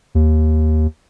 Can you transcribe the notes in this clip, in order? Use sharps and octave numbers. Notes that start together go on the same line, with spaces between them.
D#2